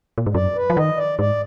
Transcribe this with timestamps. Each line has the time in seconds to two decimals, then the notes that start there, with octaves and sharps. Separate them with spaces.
0.18 A#2
0.26 G#2
0.35 F#2 D5
0.56 B4
0.70 F3
0.76 D#3 D#5
0.97 D5
1.19 G#2 D5